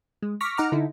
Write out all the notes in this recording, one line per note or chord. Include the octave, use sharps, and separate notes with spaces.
G#3
C#6 D6 F6 A#6 B6
D#4 F#5 A#5 D6 F6
D3 D#4 E4